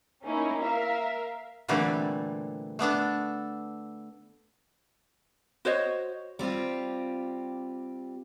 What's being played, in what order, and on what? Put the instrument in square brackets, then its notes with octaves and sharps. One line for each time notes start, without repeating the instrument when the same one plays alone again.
[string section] A#3 C#4 D#4 E4
A#4 E5 F5
[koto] A#2 D3 E3 G3 A3 C4
A3 B3 D4 A4
[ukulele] F#4 C5 C#5 D#5
[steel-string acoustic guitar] G3 C4 F4 G4